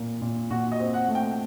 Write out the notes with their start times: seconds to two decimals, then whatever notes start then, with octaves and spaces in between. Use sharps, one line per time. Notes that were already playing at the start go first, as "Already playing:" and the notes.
Already playing: A#2 A#3
0.21 A#2
0.50 A#2 F#4
0.72 D#5
0.79 C4
0.94 F#5
1.08 A3
1.15 G5